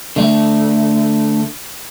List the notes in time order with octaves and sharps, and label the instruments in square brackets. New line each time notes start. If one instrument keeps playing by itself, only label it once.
[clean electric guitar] D3 A3